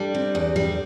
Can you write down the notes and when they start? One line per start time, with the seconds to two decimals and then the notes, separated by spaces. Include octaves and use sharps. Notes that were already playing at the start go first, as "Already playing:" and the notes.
Already playing: G3 D4
0.15 C3
0.35 E2
0.56 G3